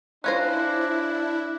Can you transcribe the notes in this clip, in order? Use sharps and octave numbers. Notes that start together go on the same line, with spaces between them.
C#4 D4 E4 F4 C5 F#6 G#6 A#6